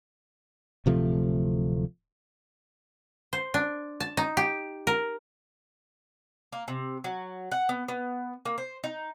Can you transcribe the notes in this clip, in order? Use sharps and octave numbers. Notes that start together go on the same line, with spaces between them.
D1 C3 F3 A3
C5
D4
A5
D#4
G4
A#4
A#3
C3
F#3
F#5
B3
B3
A#3
C5
D#4